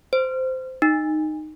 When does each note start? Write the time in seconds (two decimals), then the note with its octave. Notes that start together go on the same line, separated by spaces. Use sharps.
0.13 C5
0.82 D#4